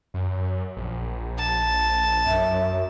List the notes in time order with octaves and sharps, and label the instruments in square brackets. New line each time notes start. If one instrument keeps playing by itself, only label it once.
[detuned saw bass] F#2
A#1
[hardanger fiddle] A5
[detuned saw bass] F#2 [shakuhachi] E5